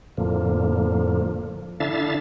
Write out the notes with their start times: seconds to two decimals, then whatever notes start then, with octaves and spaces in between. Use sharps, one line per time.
0.17 F2 A2 D3 F3 A#3
1.80 D3 D4 E4 E5 F5 A6